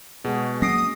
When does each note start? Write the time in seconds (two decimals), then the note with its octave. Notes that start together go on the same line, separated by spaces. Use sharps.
0.24 B2 G#3 F#4 G#4
0.62 F#3 A#3 C#4 D#6 A#6 C7 D7